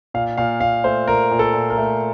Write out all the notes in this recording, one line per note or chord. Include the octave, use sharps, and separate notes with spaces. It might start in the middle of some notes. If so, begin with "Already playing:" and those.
A#2 F5
A#2 F5
A#2 F5
A3 C5
A#2 A#4
A#2
A4
A#2
A#4
A3